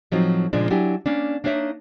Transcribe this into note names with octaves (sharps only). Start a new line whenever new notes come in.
A2 F3 F#3 C4 D#4
A#2 C#3 F3 G#3 D4
F#3 D4 E4 G4 G#5
A#3 C#4 D4
A#3 D4 D#4 C#5 E5